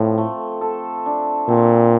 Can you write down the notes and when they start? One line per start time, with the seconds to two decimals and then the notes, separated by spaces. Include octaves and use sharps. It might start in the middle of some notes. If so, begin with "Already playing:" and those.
Already playing: A2 F3 C4
0.18 A3
0.61 A4
1.06 D4
1.48 A#2 C4